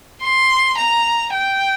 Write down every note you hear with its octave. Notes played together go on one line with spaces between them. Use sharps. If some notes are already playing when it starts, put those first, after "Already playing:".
C6
A#5
G5